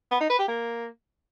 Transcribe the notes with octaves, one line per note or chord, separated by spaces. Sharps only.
B3
D#4
B4
G4
A#3